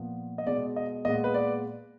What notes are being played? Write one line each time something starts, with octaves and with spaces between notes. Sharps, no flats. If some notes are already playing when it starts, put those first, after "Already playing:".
Already playing: A#2 F3 B3
D#5
B2 G#3 B3 D5
D#5
A#2 G#3 B3 D#5
B4
D5